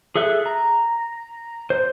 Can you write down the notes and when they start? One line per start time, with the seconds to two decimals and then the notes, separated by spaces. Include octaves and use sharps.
0.15 G#4 A4 E5 F#6
0.46 A#5
1.70 C5